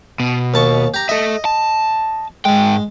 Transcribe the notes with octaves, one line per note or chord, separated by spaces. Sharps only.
B2
D#2 A5 C#6
G4 A#5
A4 D#5 E5
A5
G#2 G#3 G5